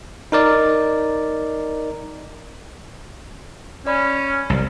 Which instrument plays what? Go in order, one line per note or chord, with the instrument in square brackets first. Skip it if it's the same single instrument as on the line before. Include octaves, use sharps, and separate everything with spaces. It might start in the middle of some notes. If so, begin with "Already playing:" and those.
[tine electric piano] D#4 A#4 D5
[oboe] C#4 [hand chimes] D5 B5
[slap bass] C2